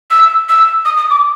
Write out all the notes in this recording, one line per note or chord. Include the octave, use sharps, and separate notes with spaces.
E6
E6
D#6
D#6
D6